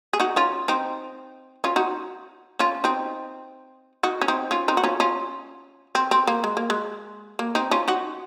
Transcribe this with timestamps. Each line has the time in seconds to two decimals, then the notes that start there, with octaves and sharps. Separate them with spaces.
0.13 G#4
0.20 D#4 F#4
0.36 C#4 F4
0.68 C4 D#4
1.64 C#4 F4
1.76 D#4 F#4
2.59 C#4 F4
2.84 C4 D#4
4.03 D#4 F#4
4.21 C#4
4.28 C4 D#4
4.51 C#4 F4
4.68 C4 D#4
4.77 F#4
4.84 C#4 F4
5.00 C#4 F4
5.95 C4
6.11 C4
6.27 A#3
6.44 G#3
6.57 A#3
6.70 G#3
7.39 A#3
7.55 C4 D#4
7.71 C#4 F4
7.88 D#4 F#4